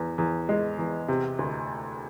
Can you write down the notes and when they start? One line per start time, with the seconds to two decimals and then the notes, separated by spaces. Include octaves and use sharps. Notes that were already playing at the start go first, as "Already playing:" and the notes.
Already playing: E2 E3
0.18 E2
0.49 G#3
0.79 E2
1.08 C3
1.39 D2